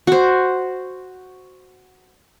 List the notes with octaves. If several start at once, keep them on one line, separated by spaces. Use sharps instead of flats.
F#4 C5